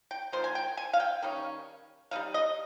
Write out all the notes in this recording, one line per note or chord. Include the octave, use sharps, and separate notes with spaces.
G5
F3 A#3 D#4 C5
G#5
G5
G#5
F5
G5
D#3 G3 A#3 C#4
G3 C4 D#4 F5
D#5